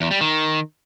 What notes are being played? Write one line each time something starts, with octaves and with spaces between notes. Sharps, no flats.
E2
G3
D#3